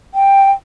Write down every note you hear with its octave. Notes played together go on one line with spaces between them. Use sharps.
G5